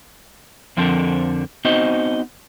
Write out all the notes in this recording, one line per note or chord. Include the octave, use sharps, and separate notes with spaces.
F2 D3 F3 C4 A4 A#4
B3 C4 D#4 F#4 C5 D#5